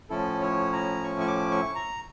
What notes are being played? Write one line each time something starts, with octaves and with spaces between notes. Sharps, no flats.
A2 F3 C#4 E4 A4
C#5
A#5
C#6
C#6
D6
C#6
A#5